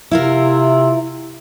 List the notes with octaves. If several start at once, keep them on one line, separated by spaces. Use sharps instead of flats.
C3 E4 F4 A#4